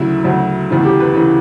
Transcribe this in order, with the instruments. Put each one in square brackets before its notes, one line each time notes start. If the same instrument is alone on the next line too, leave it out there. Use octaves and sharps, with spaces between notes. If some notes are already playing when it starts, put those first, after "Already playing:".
Already playing: [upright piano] D2 C#3 F#3 E4
D2 C#3 F#3
E1 D2 C#3 E3
G4
B4
C#3 E3